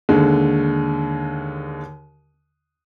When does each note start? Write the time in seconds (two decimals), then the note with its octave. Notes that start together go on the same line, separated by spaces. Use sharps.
0.09 D#2 D3 G#3